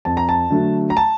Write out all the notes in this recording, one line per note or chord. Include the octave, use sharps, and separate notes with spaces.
F2 A5
A#5
A5
D3 F#3 A3
A#5
A5